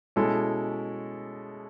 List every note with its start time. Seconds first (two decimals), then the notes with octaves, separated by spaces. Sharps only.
0.16 B2 G#3 C#4 E4 A4